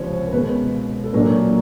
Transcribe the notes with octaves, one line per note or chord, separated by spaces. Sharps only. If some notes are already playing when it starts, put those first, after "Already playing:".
Already playing: C#2 C3 F3 C5 C#5
A#4
B2 G#3 B3 B4
A4
A#2 F#3 A#3 D4 A#4